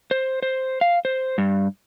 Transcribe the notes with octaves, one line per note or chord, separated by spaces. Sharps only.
C5
C5
F5
C5
G2